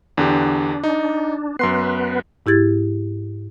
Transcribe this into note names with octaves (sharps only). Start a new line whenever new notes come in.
E2 D3 D4 G4
D#4
F#2 B3 B4 C6 C7
G#2 E4 G4 G#6 A6